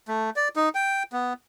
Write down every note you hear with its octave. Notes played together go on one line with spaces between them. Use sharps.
A3
D5
D#4
G5
B3